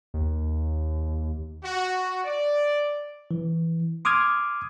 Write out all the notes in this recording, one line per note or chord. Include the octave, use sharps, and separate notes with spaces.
D#2
F#4
D5
E3
C6 D6 D#6 F6 G#6